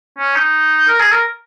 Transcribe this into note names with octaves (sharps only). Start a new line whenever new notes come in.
C#4
D#4
A#4
G#4
A#4